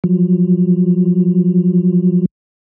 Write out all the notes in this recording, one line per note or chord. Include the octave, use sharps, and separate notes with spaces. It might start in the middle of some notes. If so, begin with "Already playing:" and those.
F3 F#3